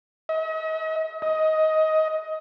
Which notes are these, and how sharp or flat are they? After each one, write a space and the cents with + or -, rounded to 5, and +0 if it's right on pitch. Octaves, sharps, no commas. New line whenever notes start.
D#5 +45
D#5 +15